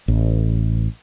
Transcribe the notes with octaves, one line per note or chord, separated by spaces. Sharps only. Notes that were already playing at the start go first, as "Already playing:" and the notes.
A1